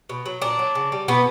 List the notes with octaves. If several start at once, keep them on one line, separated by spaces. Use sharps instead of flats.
B2
F#3
A#2 D4
F#3
C#3
G3
B2 B3